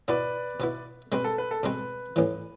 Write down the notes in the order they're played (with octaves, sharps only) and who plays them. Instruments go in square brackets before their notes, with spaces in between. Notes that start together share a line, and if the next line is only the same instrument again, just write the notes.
[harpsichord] B2 B3 E4 [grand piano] B4 D5
[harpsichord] B2 B3 E4
[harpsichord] B2 G#3 C4 [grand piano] B4
[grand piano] A4
B4
A4
[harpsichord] B2 G#3 C4 [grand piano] B4
[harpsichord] A1 A2 E3